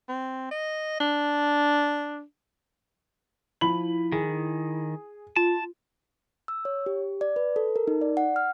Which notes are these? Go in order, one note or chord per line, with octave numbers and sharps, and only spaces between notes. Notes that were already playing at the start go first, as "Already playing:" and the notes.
C4
D#5
D4
F3 E4 B5 F#7
D#3 G#4
F4 A5
E6
C#5
G4
D5
B4
A4
A#4
D#4
D5
F#5
F6